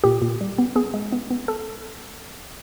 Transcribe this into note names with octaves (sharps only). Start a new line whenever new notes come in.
A#2 G4
A#2
G3
B3
B3 G#4
G#3
B3
B3
A4